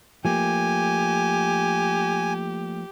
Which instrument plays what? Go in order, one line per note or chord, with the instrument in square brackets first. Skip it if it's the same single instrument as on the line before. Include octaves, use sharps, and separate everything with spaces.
[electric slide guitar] F3 A3 A#3 [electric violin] G4 [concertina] G#5